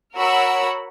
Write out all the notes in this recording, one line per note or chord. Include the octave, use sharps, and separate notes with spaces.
F#4 A#4 C#5 F#5 B5 E6